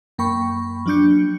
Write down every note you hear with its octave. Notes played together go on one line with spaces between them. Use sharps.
F#2 A#3 G5 B5 C#6
F3 F#3 D4 D6 G6 C#7